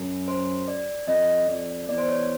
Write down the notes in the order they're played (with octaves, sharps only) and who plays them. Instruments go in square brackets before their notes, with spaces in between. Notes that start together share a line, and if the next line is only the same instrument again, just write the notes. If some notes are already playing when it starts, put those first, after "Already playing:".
Already playing: [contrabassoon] F#2
[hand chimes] C5
D5
[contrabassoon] F2 [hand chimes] D#5
[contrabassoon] F2 [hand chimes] D5
[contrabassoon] E2 [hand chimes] D5
[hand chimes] C5
C#5